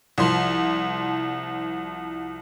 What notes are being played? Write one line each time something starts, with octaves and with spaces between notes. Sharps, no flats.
C2 F3 C6